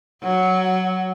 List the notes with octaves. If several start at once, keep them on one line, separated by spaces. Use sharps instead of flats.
F#3 F#5